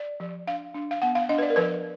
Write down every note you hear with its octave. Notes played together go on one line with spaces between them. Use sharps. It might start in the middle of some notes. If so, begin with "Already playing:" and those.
Already playing: D5
F3
D4 F5
D4
F5
B3 F#5
F5
D4 D#5
B4
D5
A#4
F3 B4